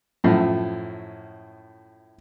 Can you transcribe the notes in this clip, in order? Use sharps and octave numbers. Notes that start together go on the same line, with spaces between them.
F#2 A2 F3